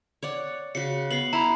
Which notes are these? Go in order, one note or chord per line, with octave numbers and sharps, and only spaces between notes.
C#5 D5 F#5
C#3 F#4 C#7
B3 C7 F#7
E4 A#5 B5